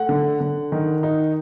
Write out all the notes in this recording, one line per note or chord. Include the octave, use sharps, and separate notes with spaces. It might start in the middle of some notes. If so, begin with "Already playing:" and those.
Already playing: A3 F#5
D3
D3
D#3
D#4